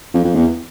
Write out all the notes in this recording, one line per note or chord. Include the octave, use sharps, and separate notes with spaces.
F2
F2
E2